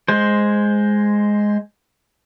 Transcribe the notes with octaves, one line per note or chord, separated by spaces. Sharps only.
G#3 C5